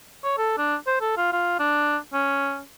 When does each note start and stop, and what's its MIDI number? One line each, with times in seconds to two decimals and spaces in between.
0.23 0.36 73
0.37 0.53 69
0.58 0.76 62
0.87 0.97 72
1.01 1.16 69
1.17 1.32 65
1.32 1.58 65
1.59 1.97 62
2.13 2.61 61